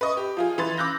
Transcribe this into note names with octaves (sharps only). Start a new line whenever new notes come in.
B4 D#5 C#6
G4
F3 F4 G#4
E3 B4 C6 A6
B5 D6 E6 F#6 G6 A#6